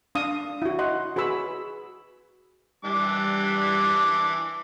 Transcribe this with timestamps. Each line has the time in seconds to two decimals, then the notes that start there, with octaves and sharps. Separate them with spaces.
0.15 D4 F5 D#6
0.62 E4 F#4
0.79 D#5 F#5 C6
1.16 F#4 G#4 B4 B5 E6
2.85 E3 G3 D4 D6